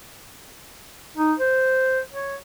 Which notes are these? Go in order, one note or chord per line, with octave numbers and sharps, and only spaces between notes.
D#4
C5
C#5